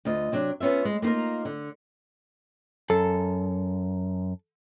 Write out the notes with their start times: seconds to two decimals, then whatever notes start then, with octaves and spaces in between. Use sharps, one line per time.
0.05 D2 F4 D#5
0.32 C3 F#3 D4
0.60 B3 C#4 F4 E5
0.85 G#3
1.02 A#3 B3 D#4 F4 A#4
1.45 D3
2.90 F#2 A4